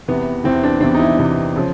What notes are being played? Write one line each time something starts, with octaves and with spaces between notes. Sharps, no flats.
E2 C3 E3 B3
E2 C3 E3 C4
D4
E2 C3 E3 D4
D#4
E4
E2 C3 E3
C#3 F3